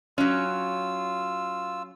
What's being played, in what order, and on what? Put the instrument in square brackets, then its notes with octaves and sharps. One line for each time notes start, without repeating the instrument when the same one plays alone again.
[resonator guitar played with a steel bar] F#3 C#4 [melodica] F4 E6